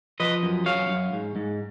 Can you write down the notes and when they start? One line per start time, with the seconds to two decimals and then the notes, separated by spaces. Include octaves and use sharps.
0.20 F3 B4 D#5
0.43 F#2
0.66 F#2 C#5 F5
0.89 F#2
1.13 G#2
1.36 G#2